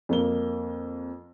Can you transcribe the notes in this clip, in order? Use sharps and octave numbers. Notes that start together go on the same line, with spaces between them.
F2 A#3 G7